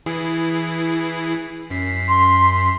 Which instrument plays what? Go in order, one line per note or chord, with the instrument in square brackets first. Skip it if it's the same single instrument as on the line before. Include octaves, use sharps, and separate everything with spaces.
[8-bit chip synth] E3 E4 G#4
F#2 B6 C7
[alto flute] C6